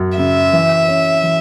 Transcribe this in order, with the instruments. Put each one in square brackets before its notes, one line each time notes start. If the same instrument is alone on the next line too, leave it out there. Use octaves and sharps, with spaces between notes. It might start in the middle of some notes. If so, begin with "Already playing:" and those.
Already playing: [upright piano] F#2
[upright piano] C#3 [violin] E5
[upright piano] E3
C#4
E3